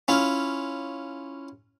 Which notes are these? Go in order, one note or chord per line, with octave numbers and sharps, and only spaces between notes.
C#4 E4 F4